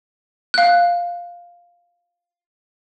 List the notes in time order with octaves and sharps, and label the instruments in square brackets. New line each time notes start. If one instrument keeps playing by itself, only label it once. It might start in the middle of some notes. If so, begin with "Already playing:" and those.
[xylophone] F5 F#6